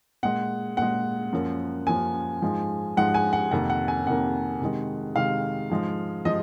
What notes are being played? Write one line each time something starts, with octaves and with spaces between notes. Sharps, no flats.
A#2 G#3 F#5
A#2 G#3 F#5
F#2 F3 A#3
F#2 F3 A#3 G#5
G#2 F3 G#3
G#2 F3 G#3 F#5
G#5
F#5
F2 C3 D#3 A#3 F#5
F#5
G#5
F2 C3 D#3 A#3 F#5
C3 D#3 G#3
C3 D#3 G#3 F5
G#2 F3 G#3
F3 G#3 D#5